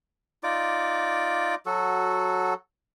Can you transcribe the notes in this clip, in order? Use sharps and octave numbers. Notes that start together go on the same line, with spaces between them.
D#4 F4 D5 D6
F#3 F#4 A4